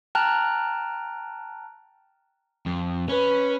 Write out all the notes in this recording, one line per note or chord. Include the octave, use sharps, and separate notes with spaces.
G5 A5 A#5 F6 F#6
F2
C#4 B4